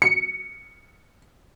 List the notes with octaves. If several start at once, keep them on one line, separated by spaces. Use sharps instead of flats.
C#7